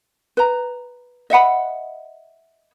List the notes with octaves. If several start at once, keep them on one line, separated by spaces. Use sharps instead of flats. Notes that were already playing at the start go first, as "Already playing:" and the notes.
B4 A#5
D#5 E5 F#5 B5